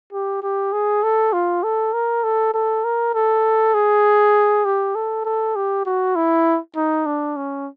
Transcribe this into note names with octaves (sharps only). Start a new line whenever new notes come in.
G4
G4
G#4
A4
F4
A4
A#4
A4
A4
A#4
A4
G#4
G4
A4
A4
G4
F#4
E4
D#4
D4
C#4